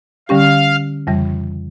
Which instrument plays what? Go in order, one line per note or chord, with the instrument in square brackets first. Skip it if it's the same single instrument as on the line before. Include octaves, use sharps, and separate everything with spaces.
[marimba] D3 G3 C#4 G4 [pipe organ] F5
[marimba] F2 C#3 E3 G3